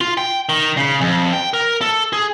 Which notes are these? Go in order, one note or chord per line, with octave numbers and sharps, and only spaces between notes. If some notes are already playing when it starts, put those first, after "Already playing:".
F4
G5
D#3
C#3
F2
G5
A#4
A4
G#4